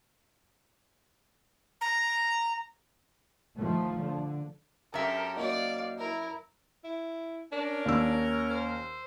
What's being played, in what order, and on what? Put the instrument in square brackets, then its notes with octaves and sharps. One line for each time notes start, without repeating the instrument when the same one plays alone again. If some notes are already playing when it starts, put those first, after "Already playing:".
[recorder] A#5
[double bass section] D#3 F3 A3
D3
[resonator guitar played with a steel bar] F#2 E5 [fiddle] G4 A4 [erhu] A#4
[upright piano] A#3 D#4 F#4 [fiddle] D5 [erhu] F5
[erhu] E4 [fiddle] A#4
[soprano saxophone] E4
[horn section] C#4 A#4 [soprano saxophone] D4
[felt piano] D#2 E6
[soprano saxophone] C5